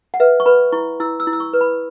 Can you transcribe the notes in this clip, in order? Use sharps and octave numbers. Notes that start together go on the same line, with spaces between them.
F#5
B4 E5
C#6
B4 B5
E4 C#6
E4 E6
E6
E4
E6
C#6
B4
B5